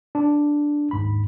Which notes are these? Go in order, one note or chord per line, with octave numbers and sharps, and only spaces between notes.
D4
D#2 G#2 B5